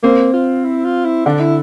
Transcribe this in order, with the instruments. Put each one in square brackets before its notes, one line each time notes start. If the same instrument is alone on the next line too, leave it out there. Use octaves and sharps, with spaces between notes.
[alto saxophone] A#3 [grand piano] C4
[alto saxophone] F4
E4
F4
E4
[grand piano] D3 [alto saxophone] D4
[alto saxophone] E4